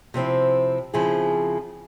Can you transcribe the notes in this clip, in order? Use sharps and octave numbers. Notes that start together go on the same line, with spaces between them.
C3 F3 C4 E4
C#3 F3 C4 E4 G#4